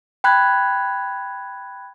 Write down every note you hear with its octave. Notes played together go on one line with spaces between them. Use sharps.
G5 B5 F#6 G#6